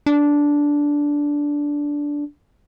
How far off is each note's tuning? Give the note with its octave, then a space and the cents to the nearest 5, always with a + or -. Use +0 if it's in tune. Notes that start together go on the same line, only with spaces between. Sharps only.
D4 -10